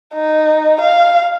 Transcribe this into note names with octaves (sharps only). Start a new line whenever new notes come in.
D#4
F5